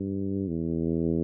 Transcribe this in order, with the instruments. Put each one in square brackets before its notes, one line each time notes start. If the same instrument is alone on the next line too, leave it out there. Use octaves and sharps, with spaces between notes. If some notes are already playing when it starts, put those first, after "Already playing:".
Already playing: [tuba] G2
E2